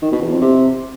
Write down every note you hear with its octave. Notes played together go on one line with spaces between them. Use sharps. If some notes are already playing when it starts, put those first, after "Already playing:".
D#3
B2
E2
F2
C3